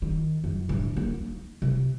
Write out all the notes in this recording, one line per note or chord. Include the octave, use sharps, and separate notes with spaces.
D#3
F#2
A2 D3
A#3
D#4
C3